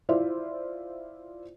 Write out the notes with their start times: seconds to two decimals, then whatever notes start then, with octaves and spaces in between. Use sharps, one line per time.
0.09 E4 F4 C5 D5 E5